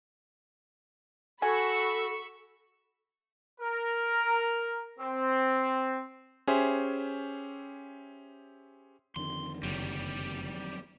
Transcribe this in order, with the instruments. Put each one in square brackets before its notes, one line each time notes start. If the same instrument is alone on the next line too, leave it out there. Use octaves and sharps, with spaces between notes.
[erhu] F#4 [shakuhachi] A4 [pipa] G#5 [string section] B5 C#6 E6
[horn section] A#4
C4
[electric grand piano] C#4 G4 G#4 C5 E5
[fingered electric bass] F2 D3 D#3 [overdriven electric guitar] C6
[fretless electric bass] F#1 [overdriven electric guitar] F#3 G3